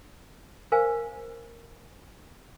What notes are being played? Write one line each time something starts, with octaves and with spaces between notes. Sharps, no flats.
A#4 C5 F5 G#5